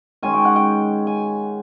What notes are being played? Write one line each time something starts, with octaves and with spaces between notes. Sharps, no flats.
D#3 G#3 C#4 G#5
G5
F#5
G5
G#5